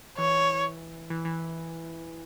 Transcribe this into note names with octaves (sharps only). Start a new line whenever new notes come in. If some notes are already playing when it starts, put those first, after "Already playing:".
E3 C#5
E3
E3